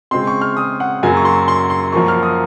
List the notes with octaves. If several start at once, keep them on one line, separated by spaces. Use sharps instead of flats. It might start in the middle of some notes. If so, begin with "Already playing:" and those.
C#3 G#3 C4 C6
C#6
F6
D#6
F#5
F#2 C#3 F#3 A#3 G#5
C#6
C6
C6
C6
F#2 F3 A#3 C#6
F6
D#6